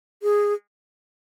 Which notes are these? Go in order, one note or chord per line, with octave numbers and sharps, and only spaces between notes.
G#4